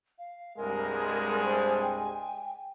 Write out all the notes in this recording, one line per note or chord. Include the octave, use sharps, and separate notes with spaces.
F5
C2 G2 G#3 A#4
C5 G#5
G5